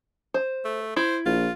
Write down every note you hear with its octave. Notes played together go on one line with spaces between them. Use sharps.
C5
A3
E4 C5
A#1 F4